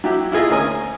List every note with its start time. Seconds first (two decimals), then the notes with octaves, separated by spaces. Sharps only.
0.04 F#3 E4 G4
0.32 E4 F4 G#4 D#5
0.50 D2 C#4 A#4 G#5 D#6